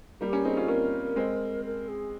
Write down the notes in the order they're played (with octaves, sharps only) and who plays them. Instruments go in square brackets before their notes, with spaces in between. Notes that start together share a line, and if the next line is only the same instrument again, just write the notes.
[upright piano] G3 A#3 [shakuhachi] G4
[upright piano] A#3 C#4
[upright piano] C4 D#4 [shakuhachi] G#4
[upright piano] C#4 F4
[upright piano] A#3 C#4 [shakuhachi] A#4
[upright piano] G#3 C4
[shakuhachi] A#4
G#4